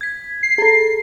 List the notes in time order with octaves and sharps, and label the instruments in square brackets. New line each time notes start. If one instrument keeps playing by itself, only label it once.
[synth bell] G#6 B6
[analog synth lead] C7
[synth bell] G#4 A4